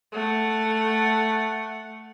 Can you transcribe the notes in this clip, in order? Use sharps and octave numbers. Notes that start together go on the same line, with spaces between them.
A3 F#5